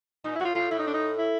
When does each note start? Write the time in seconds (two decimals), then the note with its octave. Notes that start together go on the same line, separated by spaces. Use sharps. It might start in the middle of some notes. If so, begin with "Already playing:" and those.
0.24 A#2 D#4
0.35 E4
0.40 A2 F#4
0.45 F4
0.55 A2 F4
0.71 A2 E4
0.79 D#4
0.87 D4
0.94 D#4
1.18 E4